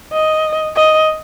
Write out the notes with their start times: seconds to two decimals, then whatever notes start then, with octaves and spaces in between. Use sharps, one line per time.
0.13 D#5
0.77 D#5